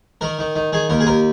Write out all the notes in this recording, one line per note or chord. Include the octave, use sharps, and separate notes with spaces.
D#3 A#4
D#3
D#3
D#3 G#4
D#2 A#4
G#4
D#2 A#4